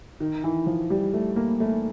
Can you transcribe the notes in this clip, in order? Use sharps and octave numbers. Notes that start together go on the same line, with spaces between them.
D#3
E3
F3
G3
A3
A#3
A3